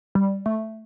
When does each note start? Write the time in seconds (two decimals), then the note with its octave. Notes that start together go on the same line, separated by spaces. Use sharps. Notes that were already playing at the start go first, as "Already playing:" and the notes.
0.15 G3
0.46 A3